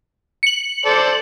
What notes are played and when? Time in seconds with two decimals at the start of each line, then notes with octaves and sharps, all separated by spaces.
0.43 C#7 F#7
0.85 A4 C5 D5